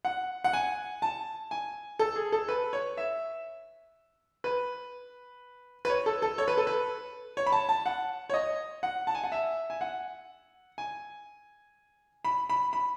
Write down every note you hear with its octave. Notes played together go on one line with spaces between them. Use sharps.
F#5
F#5
G#5
A5
G#5
A4
G#4
A4
B4
C#5
E5
B4
B4
C#5
A4
A4
C#5
B4
A4
B4
C#5
B5
A5
A5
F#5
C#5
D#5
F#5
A5
G#5
F#5
E5
G#5
F#5
G#5
B5
B5
B5